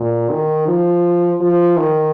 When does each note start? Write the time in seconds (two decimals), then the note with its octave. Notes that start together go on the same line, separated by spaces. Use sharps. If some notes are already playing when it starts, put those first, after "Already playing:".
Already playing: A#2
0.30 D#3
0.68 F3
1.41 F3
1.77 D#3